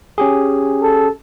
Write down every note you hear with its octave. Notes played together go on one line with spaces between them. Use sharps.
C#4 G4 G#4
A4